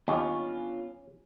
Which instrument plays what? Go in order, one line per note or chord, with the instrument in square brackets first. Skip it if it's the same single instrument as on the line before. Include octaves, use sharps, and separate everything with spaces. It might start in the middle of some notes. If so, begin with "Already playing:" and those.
[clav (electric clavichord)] D#2 [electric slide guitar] B3 D4 F4 [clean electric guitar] C#4